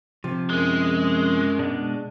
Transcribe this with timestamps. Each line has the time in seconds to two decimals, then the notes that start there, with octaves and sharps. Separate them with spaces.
0.24 C3 F3
0.49 F#2 G#3
1.59 B2 G#3 D4